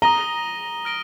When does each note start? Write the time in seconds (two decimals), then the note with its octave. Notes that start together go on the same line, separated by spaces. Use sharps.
0.02 A#5 D#6 A#6 D#7 G7
0.85 F6 A#6 D7 G7